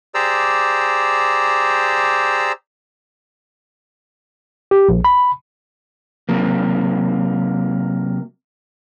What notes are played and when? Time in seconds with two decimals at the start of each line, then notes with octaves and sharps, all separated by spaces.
0.15 G4 G#4 C5 D5 A#5 E6
4.71 G4
4.89 A#1
5.05 B5
6.29 C3 F#3 A#3